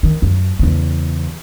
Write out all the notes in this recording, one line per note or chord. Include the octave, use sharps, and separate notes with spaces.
D#3
F#2
E2 C#3